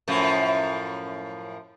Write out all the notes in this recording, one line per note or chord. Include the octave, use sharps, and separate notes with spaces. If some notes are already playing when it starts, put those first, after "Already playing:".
F#2 A2 F3